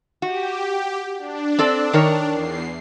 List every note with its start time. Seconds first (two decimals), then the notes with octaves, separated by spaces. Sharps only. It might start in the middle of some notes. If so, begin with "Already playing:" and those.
0.22 F#4 G4
1.19 D4
1.59 C4 A4 D5
1.93 D#3 A#4 C#5
2.29 E2 C7